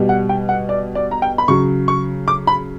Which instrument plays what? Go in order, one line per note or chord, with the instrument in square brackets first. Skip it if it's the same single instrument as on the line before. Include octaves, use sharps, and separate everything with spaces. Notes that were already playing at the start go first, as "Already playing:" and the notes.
Already playing: [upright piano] B2 G3
F#5
G5
F#5
D5
D5
A#5
G5
B5
C#3 F#3 C#6
C#6
D6
B5